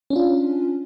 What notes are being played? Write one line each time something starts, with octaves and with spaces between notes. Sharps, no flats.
C#4 D4 F4